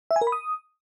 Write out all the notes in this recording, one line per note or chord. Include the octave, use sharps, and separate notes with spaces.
E5
G#5
A#4
B5
D#6